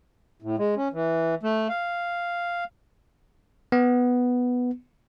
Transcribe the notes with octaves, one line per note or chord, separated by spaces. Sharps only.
A2
G#3
C#4
E3
A3
F5
B3